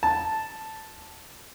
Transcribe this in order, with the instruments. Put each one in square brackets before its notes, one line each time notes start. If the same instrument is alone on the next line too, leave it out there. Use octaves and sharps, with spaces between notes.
[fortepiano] A5